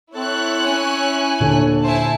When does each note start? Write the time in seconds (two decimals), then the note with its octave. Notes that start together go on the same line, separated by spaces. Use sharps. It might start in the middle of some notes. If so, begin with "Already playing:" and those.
0.15 C4 E4 A4 C#5 F#6
0.67 C#4 G#5
1.40 D#2 A#2 D3 A4
1.84 E4 C5 G#5 A5